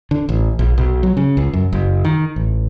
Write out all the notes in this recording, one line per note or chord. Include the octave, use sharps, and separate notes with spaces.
D3
A1
A#1
B1
F#3
C#3
C#2
F#2
F#1
D#3
A1